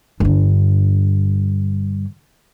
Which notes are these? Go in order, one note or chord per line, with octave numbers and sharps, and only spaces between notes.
G2 D3